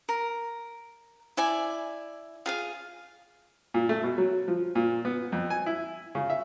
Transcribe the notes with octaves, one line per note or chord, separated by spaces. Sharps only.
A#4
E4 D5 G#5
F4 G#4 F5
A#2
A3
B2
F#3
F3
A#2
B3
F2
G#5
E4
C#3
E5